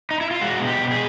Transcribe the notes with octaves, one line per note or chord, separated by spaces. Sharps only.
D#4
E4
F4
G#3 F#4
B2
G4
B2
G#4